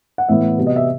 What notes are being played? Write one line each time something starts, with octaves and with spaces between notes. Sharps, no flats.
F#5
A2 E3 B3 E5
C3 F#3 B3
D#5
E5